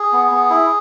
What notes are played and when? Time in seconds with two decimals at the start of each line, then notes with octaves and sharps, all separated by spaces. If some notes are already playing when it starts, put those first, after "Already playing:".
Already playing: G#4
0.13 B3
0.31 B3
0.50 E4